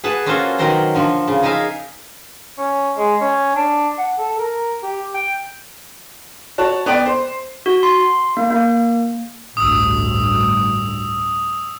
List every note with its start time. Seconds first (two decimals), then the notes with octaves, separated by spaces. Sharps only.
0.04 G#4 B4 F#5 A5
0.26 A#3 C#4 F4 F#4 A4 C5
0.58 B2 D#3 F#3 A#4 C5 A#5
0.95 D3 F3
1.27 C#3
1.43 D#4 G#4 A#4 E5 F5
2.58 C#4
2.97 G#3
3.21 C#4
3.55 D4
3.98 F#5
4.18 A4
4.38 A#4
4.83 G4
5.14 G5
6.58 F#4 C#5 A5
6.86 B3 D5 G5
7.05 C5
7.66 F#4
7.83 C6
8.37 A#3
8.50 A#3
9.57 A1 D2 G2 D#6 E6